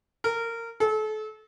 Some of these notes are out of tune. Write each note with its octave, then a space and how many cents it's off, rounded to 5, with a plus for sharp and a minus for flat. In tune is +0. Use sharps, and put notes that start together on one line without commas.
A#4 -20
A4 -35